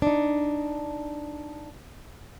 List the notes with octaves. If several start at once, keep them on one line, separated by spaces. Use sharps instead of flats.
D4 D#4